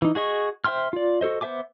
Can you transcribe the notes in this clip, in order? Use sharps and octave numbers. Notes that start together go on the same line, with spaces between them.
E3 D#4
F#4 G#4 D#5 C#6
C5 E5 G5 C6 F6
F4 D5
F#4 A4 C5 D#5
B3 C5 E5 G#5 D6